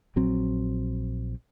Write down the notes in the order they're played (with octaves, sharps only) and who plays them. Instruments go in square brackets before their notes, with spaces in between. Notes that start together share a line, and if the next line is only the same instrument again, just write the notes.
[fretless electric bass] A#1 F#3 C4